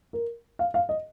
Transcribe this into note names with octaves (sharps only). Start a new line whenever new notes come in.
A#4
F5
F5
D#5